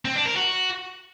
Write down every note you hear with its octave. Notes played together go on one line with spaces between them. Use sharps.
C4
D4
A#4
F#4